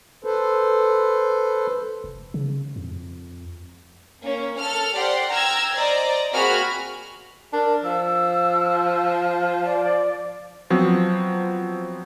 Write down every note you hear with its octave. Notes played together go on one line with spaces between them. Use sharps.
A4 B4 C5
F1
C#3
F2
A#3 C#4
A4 F6
G4 C5 D5 F#5 C6
G5 A#5 E6 F6 G#6
C5 D5 D#5 A#5
A#3 C4 F#4 G#4 B5 F6
D4 A#4
F3 E6
D5
F3 F#3 B3 C4